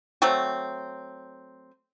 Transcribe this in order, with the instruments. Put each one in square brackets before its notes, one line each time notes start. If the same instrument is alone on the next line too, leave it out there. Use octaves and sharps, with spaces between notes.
[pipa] F#3 A3 C4